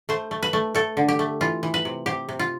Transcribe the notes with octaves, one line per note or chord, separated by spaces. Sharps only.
A3 C5
A3
B4
A3
A3 A4
D3
G4
A3
E3 F4
E3
B4
C3
C3 G4
C3
F4